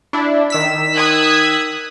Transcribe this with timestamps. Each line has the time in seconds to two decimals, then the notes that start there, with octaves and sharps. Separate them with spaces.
0.13 D4 E4
0.50 D#3 E6 B6
0.95 D#6 F#6 G#6